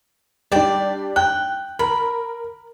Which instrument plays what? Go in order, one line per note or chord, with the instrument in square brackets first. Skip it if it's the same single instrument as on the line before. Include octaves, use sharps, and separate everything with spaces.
[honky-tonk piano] G3 D4 [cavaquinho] D5 G5
[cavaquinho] G5 [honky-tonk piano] F#6
[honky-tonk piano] A#4 [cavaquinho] B5